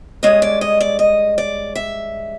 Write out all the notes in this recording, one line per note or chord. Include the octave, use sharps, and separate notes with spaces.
G2 E3 G#3 C#4 D#5
D5
D#5
D5
D#5
D5
E5